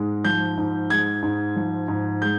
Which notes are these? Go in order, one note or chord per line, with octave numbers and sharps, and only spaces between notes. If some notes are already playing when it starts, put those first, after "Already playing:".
Already playing: G#2 G#3
F3 G6
G#2
G#3 G#6
G#2
F3
G#2
G#3 G6